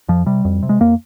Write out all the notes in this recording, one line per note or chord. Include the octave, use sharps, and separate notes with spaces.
F2 F3
C3 G3
F2
C3
G#3
F2 A#3